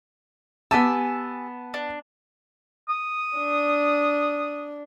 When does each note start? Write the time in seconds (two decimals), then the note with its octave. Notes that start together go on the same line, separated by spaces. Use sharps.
0.71 B3 G4 G#5 A5 E6
1.74 D4
2.89 D#6
3.38 D4